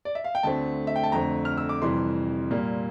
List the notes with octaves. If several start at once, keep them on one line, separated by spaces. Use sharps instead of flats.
D5
E5
F5
G5
D2 D3 A3 C4 A5
E5
G5
A5
F2 D3 A3 C4 A#5
F6
E6
D6
F2 C3 E3 G3 C6
A#2 G3 A#3